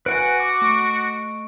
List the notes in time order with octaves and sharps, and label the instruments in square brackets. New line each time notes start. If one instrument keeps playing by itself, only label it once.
[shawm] F#4 [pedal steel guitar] B4 F#5 G#5 [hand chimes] D7
[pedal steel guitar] D6
[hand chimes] A3 C#6 D7